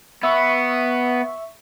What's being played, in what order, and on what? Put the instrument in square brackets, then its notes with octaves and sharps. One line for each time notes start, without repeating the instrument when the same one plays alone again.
[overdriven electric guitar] B3 [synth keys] E5 C#6